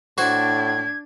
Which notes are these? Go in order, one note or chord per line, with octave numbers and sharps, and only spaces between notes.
A2 D4 F#4 C5 G#6